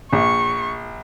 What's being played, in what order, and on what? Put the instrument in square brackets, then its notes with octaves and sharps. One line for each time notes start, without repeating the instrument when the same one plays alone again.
[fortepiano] A#1 [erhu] C#6